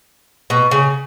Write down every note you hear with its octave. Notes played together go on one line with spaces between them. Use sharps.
B2
C#3